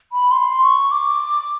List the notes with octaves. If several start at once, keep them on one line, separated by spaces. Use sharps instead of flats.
B5
C6
C#6
D6